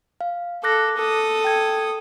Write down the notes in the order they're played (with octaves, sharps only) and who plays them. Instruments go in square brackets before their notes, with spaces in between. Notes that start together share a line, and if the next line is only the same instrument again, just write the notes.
[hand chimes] F5
[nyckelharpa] A4 [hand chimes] D6 F#6 A#6
[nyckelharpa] A4 D#6
[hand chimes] G5 G#6